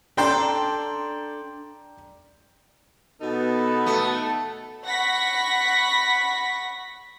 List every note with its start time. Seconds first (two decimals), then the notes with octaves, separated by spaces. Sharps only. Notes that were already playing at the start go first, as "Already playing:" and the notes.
0.17 D4 A4 D5 G5 A#5 C6 G6
3.21 B2 B3 D#4 A4
3.86 A3
4.86 F#5 B5 C#6 A#6 B6